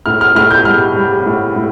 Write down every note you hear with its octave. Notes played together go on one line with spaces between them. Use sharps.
A2 F6
F6
A2 F6
G6
G3 F6
G3
A2
A2